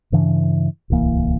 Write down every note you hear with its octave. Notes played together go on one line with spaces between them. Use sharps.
G2 C#3 E3 D4
D1 C2 E3 A#3